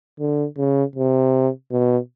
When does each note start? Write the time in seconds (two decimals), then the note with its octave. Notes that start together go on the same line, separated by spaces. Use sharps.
0.19 D3
0.57 C#3
0.96 C3
1.71 B2